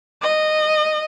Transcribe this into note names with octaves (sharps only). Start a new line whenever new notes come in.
D#5